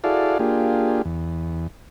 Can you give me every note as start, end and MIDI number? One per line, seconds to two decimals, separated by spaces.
0.04 0.38 64
0.04 0.38 66
0.04 0.38 68
0.04 0.38 69
0.04 0.38 74
0.04 0.38 77
0.39 1.02 58
0.39 1.02 62
0.39 1.02 65
0.39 1.02 67
0.39 1.02 68
1.05 1.67 40